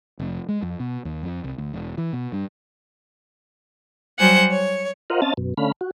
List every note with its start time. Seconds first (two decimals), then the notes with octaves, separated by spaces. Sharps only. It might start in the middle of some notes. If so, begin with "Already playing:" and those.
0.19 F1
0.48 G#3
0.62 F2
0.80 B2
1.05 D#2
1.23 F2
1.44 C2
1.58 D2
1.73 E1
1.98 E3
2.13 B2
2.32 G2
4.19 F#3 G3 C5 F#5 G#5 G6
4.50 C#5
5.10 F4 A#4 C5 D#5 F5 F#5
5.22 C4 C#4 D#5 F5 A5 A6
5.37 F#2 B2
5.57 D3 A3 C#4 F5 B5
5.81 F#4